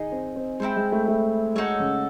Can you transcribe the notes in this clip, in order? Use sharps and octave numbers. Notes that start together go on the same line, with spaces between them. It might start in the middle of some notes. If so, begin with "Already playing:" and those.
Already playing: D#3 D#4 G#4 D#5
C4
C4
G#3 C4 E4 A4 C5
G#3
A3
A3
G#3 D#4 F#4 A4 C#5
C#3